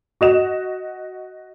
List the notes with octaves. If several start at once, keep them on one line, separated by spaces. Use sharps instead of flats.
F#4 D#5 E7